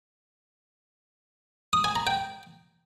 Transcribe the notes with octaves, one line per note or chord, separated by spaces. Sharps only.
D#6
G#5
A#5
G5